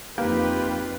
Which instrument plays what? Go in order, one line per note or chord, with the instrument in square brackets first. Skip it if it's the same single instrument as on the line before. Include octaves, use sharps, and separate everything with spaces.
[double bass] F2 D#4 [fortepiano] A#3 [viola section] F4 B4 [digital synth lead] G4